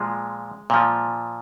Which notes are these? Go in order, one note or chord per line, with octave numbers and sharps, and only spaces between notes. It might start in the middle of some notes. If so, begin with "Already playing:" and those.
Already playing: A#2 F3 G#3
A#2 F3